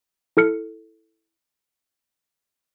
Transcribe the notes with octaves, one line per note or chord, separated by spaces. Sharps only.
E4 A4 F6 C#7